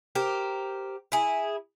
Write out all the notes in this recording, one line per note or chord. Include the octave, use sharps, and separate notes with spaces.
G4 A#4 C5
E4 G#4